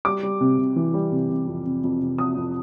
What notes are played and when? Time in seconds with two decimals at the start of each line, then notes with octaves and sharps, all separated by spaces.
0.05 G3 D6
0.23 G3
0.41 C3
0.59 C3
0.76 E3
0.94 G3
1.12 C3
1.30 C3
1.47 F2
1.65 C3
1.83 F2
2.01 C3
2.18 F2 D#6
2.36 F2